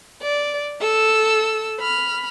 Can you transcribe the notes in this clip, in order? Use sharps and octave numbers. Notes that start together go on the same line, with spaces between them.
D5
A4 E6
B5 F6